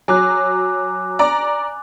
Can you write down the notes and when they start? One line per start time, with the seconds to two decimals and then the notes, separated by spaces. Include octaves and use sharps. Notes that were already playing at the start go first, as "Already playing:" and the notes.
0.08 F#3 G#5 D6 F#6
1.19 D5 A#5